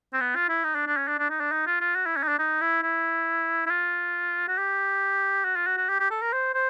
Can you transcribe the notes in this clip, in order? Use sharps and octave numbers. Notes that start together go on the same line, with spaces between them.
C4
B3
F4
E4
D#4
D4
D4
C#4
D4
D4
D#4
D4
D#4
F4
F4
F#4
E4
C#4
D#4
D4
D#4
E4
E4
E4
F4
F#4
G4
F#4
F4
F#4
F#4
G4
G4
A4
A#4
C5
C5